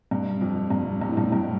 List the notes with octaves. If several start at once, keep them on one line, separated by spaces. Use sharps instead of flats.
G2
F2
G2
G2
A2
G2
A2
G2